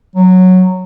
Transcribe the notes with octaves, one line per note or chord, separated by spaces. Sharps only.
F#3